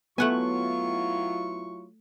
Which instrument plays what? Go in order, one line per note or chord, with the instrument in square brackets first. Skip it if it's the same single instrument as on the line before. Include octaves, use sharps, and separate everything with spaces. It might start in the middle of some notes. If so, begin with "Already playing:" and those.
[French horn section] F#3 E4 F4 [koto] A3 F#5 G#5 [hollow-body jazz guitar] B3 [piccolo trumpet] C#6